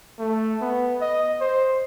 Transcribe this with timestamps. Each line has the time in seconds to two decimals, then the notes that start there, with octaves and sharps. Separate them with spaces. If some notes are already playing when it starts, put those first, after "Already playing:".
0.18 A3
0.61 B3
1.01 D#5
1.41 C5